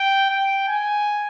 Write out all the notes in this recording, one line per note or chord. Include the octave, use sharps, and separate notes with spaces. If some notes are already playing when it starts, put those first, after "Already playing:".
Already playing: G5
G5
G#5